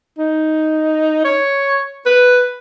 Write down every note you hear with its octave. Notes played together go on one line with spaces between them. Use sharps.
D#4
C#5
B4